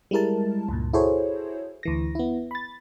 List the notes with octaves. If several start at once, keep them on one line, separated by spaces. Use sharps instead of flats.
G3 G#3 E4 A#4 A5
C#2 G2 A#2
E4 F#4 G#4 A4 C5 C#5
D2 E3 A#6
B3 E4
B5 A6